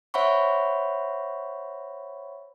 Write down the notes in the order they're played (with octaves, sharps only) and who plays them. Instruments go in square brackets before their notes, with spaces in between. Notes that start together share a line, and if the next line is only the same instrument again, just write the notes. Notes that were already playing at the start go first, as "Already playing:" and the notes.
[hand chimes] C5 C#5 E5 F#5 B5 C#6